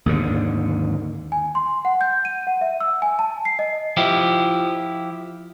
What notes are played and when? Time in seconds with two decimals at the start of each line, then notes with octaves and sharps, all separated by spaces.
0.06 D#2 G#2 D3
1.32 G#5
1.55 C6
1.85 F#5
2.01 G6
2.25 D#7
2.47 F#5
2.61 E5
2.80 E6
3.02 G#5
3.19 A5
3.45 C7
3.59 D#5
3.97 F3 E4 G4